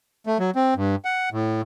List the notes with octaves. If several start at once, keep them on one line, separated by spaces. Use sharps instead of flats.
A3
F#3
C4
G2
F#5
A2